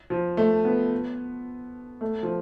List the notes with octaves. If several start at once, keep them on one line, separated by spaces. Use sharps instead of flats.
F3
A3
B3
A3
F3